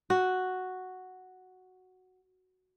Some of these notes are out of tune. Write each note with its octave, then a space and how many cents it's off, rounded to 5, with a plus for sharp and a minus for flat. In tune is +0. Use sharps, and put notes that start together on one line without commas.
F#4 +0